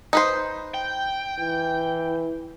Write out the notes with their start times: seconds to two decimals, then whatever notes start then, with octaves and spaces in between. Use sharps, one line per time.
0.13 D#4 B4 C5
0.74 G5
1.40 E3